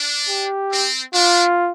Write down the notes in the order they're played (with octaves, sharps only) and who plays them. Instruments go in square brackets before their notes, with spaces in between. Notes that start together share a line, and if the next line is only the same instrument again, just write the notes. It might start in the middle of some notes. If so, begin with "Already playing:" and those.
Already playing: [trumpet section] D4
[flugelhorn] G4
[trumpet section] C4
[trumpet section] D4 [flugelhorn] F4